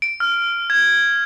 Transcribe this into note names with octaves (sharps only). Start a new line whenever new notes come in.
D7
F6
G#6